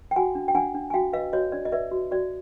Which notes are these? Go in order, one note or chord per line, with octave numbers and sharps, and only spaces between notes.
G5
F#4 F#5 G#5
D4
G5
D4 F#5 G#5
D4
G#5
F#4 F5 G5
B4 D#5 F5
F#4 C#5 D#5
D4 D5
D#5
B4 D5 E5
F#4
F#4 D5